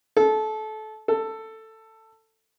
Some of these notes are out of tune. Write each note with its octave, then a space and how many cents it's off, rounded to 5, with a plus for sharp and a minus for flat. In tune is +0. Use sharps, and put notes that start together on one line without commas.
A4 -25
A4 +10